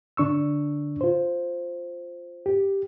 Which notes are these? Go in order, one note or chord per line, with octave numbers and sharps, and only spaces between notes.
D3 D4 C#6 E6
F4 C5
G4